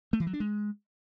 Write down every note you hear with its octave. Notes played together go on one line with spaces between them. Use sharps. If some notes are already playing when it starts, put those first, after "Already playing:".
A3
E3
F#3
D4
G#3